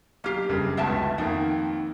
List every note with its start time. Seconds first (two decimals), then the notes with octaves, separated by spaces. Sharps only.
0.24 B1 A#3 G4 F6 C7
0.49 F#1 G2 C#3
0.77 D1 G1 C#2 B3 E5 A5
1.18 F2 D#3 A#3 B3